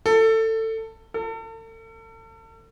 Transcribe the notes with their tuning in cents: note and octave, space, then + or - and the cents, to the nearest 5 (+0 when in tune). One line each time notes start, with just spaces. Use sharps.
A4 +20
A4 +40